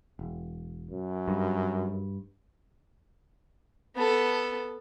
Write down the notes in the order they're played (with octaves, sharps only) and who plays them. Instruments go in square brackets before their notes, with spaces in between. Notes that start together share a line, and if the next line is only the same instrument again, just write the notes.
[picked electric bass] E1
[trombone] F#2
[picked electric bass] G2
[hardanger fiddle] B3 A4